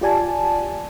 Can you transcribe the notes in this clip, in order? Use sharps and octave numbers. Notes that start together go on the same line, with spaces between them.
F4 G4 D5 G#5 A5